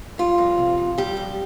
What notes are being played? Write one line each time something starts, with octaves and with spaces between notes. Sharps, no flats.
G3 F4
F2
C3
F2
G3 G4
F2